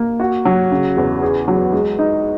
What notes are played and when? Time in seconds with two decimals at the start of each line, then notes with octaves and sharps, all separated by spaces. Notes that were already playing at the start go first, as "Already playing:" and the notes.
Already playing: A#3
0.20 F#4
0.45 F#3
0.71 C#3
0.97 E2
1.22 G#4
1.48 F#3
1.73 G#3
1.99 D#4